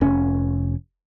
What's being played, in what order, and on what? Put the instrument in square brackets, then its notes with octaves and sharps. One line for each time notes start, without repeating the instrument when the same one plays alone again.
[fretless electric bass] F1 C#4